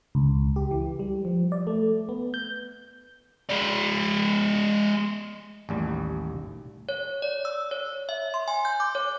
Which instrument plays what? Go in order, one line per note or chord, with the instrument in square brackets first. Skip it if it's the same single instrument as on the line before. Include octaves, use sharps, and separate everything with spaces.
[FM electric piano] C#2
G4
E3
G3
F3
D5
A3
B3
G6
[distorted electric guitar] G#3 D5
[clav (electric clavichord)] A1 D#2 G3
[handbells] C#5
D5
E6
C#5
E5
C6
G#5
G6
D6
C#5